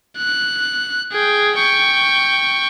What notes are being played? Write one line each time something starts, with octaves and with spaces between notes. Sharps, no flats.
F#6
G#4 G5
G5 C#6